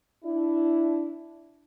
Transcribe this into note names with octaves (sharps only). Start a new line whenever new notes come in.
D4 E4